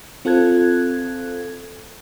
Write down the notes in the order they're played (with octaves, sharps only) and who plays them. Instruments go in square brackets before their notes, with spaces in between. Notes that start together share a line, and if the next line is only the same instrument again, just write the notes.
[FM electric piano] C4 F4 A4 F#6 G#6